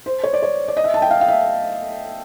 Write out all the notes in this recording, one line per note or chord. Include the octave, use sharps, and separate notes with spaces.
C5
C#5
D5
C#5
D5
D#5
E5
A5
G5
F5
F5
E5